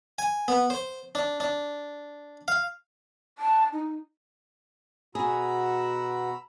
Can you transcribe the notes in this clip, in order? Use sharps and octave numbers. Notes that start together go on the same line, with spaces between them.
G#5
B3
C5
D4
D4
F5
A5
D#4
B2 F#4 G#4 A#5 B5 E6